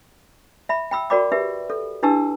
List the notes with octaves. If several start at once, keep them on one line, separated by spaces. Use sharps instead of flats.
E5 B5
G5 B5 E6
F#4 A#4 D5 G5 B5 D6
G4 B4 E5
A4
D4 E4 G4 B4 A5 E6